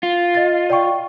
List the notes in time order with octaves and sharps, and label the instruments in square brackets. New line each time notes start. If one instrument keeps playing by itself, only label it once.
[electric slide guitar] F4
[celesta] D#5 A6
D5 G5 C#6